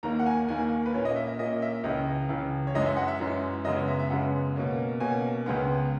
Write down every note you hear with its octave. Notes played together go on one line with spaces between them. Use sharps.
D#2 D#3 A#3 A#5
F#5
G#5
D#2 D#3 A#3 G#5
B4
A#2 A#3 C#4 C#5
D#5
E5
E5
A#2 A#3 C#4 D#5
D#5
E5
C#2 C#3 E3 D#5
C#2 C#3 E3
C#5
F#2 E3 G#3 C#4 D#5
E5
F#5
E5
F#2 E3 G#3 C#4
F#2 C#3 G#3 B3 D#5
C#5
E5
E5
F#2 C#3 G#3 B3 F#5
B2 A#3 C#4
B2 A#3 C#4 G#5
C#2 C#3 G#3 B3